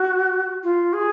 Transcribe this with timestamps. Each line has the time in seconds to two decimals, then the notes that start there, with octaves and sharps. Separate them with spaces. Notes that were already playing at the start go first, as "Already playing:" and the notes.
Already playing: F#4
0.64 F4
0.93 G#4